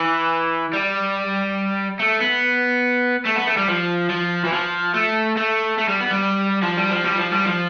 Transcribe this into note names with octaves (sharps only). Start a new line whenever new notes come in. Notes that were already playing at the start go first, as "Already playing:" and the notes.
Already playing: E3
G3
A3
B3
A3
B3
A3
G3
F3
F3
E3
F3
A3
A3
A3
G3
B3
G3
F3
G3
F3
G3
F3
G3
F3